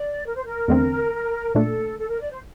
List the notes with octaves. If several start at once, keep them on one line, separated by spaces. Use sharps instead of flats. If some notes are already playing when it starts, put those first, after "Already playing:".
Already playing: D5
A#4
C5
A#4
E2 D3 A3 C4
A#2 A3 D4 A4
A4
A#4
D5
C5